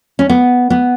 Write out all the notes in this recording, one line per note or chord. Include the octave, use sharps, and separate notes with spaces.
C#4
B3
B3